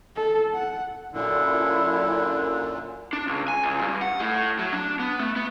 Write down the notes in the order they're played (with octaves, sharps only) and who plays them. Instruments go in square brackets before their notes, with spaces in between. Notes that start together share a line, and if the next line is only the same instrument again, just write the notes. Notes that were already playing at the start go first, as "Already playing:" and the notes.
[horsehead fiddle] A4
F#5
[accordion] F#2 A#2 [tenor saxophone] D3 [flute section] E4
[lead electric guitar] D4
C#2
G#5
C#2
G2
F#5
A2
F#3
D4
B3
A3
B3